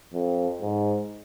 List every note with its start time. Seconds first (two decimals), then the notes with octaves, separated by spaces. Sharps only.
0.14 F2
0.62 G#2